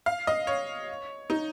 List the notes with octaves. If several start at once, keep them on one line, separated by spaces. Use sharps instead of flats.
F5
D#5
C#5
D#4